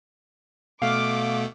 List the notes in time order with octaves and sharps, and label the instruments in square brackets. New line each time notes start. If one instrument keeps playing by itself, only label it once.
[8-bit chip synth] B2 A3 [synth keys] F5 [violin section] D6